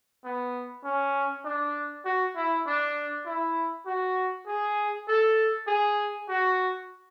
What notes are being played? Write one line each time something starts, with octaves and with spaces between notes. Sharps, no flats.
B3
C#4
D4
F#4
E4
D4
E4
F#4
G#4
A4
G#4
F#4